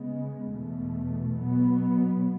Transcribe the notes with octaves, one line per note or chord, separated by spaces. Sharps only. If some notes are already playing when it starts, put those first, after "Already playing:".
Already playing: C#3 G#3 B3
E2 B2 A3
B2 F#3 B3